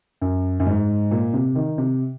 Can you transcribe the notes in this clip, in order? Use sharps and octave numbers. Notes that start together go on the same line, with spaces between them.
F#2
F#2
G#2
A#2
C3
D#3
C3